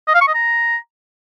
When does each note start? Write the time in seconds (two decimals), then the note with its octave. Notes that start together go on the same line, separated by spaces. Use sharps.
0.08 D#5
0.14 F5
0.21 C#6
0.28 D#5
0.34 A#5